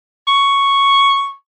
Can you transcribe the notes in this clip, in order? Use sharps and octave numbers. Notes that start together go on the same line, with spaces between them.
C#6